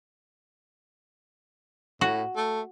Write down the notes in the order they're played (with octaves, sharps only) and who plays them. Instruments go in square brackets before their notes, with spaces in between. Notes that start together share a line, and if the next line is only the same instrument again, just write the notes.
[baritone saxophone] A2 [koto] F#4
[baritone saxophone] A3